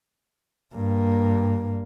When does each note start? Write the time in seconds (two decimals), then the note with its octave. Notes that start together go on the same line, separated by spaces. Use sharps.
0.75 G2 A#3